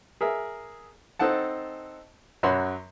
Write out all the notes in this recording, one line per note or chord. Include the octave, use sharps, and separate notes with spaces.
G#4 A#4 E5
C4 D#4 A4 F#5 A5
F#2 F#3 F#4 C#5 B5 C6